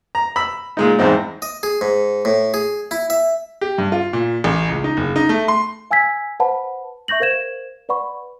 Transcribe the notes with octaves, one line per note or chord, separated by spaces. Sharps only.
A#5
B5 E6
A#2 G#3 D#4
E2 G#2 C4 D#4
D#5
G#4
G#2
A2
G#4
E4
E5
G4
G2
F4
A#2
A1
C#2
D#4
F#1
D#4
A3
C6
F5 G#5 E6 G#6 B6
B4 C5 F#5 A5 B5
E5 C#6 G6 A#6 F#7
A#4 C5 F5 G#6 E7
B4 D5 F#5 B5 C#6